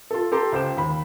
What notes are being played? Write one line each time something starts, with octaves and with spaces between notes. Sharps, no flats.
F4 A4
G4 A4 A#5 C6
C#2 C5 G5 E7
D#2 B5